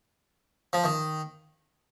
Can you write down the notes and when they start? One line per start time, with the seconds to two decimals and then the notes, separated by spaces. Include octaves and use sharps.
0.73 F3
0.84 D#3